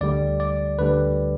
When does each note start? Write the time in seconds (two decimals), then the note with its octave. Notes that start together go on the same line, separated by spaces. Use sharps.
0.01 D2 D3 G3 D5
0.40 D5
0.79 D2 D3 G3 B4